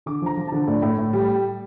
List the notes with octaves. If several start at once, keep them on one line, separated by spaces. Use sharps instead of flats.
D3 D6
F3 A#5
F3
D3 A5
A2 D5
A2
A2
G3